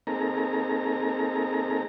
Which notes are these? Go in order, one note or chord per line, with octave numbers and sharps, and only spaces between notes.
A#3 C4 D#4 G#4 A4 A#5